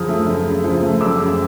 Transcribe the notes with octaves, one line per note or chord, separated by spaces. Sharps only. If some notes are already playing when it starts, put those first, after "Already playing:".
Already playing: F#2 C#3 F3 D#6 F6
A3
F#2
C#3
F3
A3
F#2 D6 E6
C#3